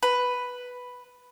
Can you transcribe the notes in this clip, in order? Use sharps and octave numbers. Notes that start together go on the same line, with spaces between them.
B4